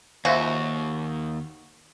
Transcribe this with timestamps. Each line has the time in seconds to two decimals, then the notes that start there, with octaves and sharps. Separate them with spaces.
0.25 D#2 C#3 F4 F#4 C5 E5